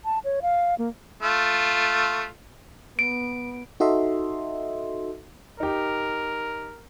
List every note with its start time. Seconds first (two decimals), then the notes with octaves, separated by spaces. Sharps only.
0.05 A5
0.24 C#5
0.42 F5
0.78 A#3
1.23 A3 F4
2.99 B3 D7
3.80 D#4 F#4 A4 D#5 E5 C6
5.60 D#4 G4 A#4